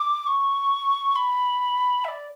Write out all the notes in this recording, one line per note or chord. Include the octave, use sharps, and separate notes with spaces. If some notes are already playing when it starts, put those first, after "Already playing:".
Already playing: D6
C#6
B5
E5
D5